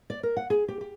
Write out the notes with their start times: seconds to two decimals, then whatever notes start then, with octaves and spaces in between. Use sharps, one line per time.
0.10 D5
0.23 A#4
0.37 F#5
0.50 G#4
0.68 G4
0.81 G4